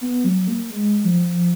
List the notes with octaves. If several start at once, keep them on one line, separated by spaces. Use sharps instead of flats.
B3
F#3
A#3
G#3
F3